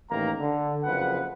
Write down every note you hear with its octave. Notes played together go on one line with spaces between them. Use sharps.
A1 D#3 A#3 A#5
D3
F#1 F2 B4 F#5